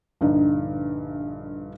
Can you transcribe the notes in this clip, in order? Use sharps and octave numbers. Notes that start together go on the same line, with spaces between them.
A#1 G2 D3 D#4